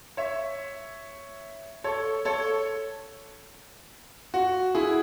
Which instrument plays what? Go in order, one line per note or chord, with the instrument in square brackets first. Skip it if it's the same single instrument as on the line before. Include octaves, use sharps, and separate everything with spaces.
[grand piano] C#5 E5
A4 C#5
A4 C#5
F#4
E4 G#4